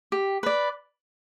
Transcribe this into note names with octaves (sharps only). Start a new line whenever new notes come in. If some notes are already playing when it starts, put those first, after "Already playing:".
G4
B4 D5